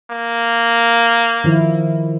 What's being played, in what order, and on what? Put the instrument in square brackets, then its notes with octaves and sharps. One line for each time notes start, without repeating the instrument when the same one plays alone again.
[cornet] A#3
[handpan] D#3 F3 E4